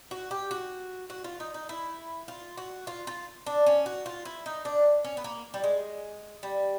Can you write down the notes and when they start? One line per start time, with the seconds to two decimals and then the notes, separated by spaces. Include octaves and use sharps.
0.11 F#4
0.31 G4
0.51 F#4
1.10 F#4
1.24 F4
1.40 D#4
1.54 D#4
1.69 E4
2.28 F4
2.57 F#4
2.87 F4
3.07 F4
3.46 D4
3.66 C#4
3.86 F#4
4.06 F4
4.25 E4
4.46 D#4
4.65 D4
5.04 C#4
5.17 B3
5.24 A#3
5.54 G3
5.64 G#3
6.43 G3